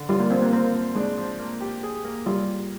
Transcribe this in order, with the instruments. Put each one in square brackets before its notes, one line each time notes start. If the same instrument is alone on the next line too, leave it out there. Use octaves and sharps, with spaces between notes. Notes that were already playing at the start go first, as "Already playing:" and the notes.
Already playing: [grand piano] D3
[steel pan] G3 [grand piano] F4
[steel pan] A#3
[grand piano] F3 [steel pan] C4
[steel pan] A#3
[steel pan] A#3 [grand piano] C4
[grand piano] F3
[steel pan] G#3 [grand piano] D4
[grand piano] F3
A#3
G4
G#4
A#3
[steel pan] G3 [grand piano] F4